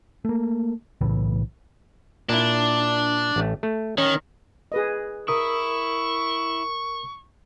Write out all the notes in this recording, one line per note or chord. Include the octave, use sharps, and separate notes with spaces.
A3 A#3
B1 A2 C#3 E3
A#2 D4 E4
A1 A3
A3
D#3 C#4
G#4 B4 D#5
E4 A#4 C#6 D#6